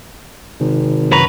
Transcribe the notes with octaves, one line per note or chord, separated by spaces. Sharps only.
G#1 C3 D#3
F#2 C#4 B4 A#5